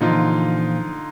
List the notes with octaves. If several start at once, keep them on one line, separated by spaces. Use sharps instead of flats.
A#2 D3 E3 F3 D#4 F4